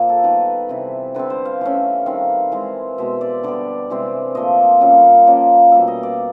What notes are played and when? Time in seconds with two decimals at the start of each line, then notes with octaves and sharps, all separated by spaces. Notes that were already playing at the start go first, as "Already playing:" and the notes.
Already playing: A#2 F3 A#3
0.09 A4
0.24 D#3 G3 B3 B4
0.69 C3 E3 G3
1.15 D3 G3 C4 B4
1.30 C5
1.45 F5
1.61 E3 A3 C#4
2.06 D#3 G3 C4 F5
2.52 E3 G#3 C4
2.98 B2 G#3 B3 E5
3.21 D5
3.43 D3 G3 B3 D5
3.90 C3 E3 G#3 C4
4.35 A#2 F3 A3 D#5
4.81 A#2 G3 A#3 C#4
5.27 A#2 F3 A#3 C#4
5.72 B2 G3 A#3 E5
5.88 D#5
6.03 D5